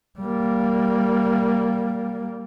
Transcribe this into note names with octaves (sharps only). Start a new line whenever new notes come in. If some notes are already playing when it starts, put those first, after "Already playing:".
G3 A#3